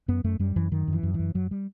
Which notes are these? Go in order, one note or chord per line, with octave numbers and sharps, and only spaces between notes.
F#2 B3
F#2 A3
F#2 G3
F#2 E3
F#2 D#3
F#2
E3
F#2
F#2 E3
F#2 F#3
G3